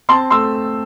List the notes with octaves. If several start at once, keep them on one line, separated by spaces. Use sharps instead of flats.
C4 A5 C6
A3 C6 E6